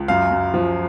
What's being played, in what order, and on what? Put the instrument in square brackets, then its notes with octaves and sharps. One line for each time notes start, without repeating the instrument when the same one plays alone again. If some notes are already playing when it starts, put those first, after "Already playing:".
Already playing: [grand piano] C#2
F#2 F5
F#2
F3